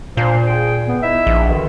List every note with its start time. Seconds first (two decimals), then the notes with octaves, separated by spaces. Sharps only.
0.17 A#2 A#3 D4 C5
0.47 G#4 G5
0.88 B3
1.03 D#4 E4 E5
1.27 A#1
1.49 B2 D3 D#3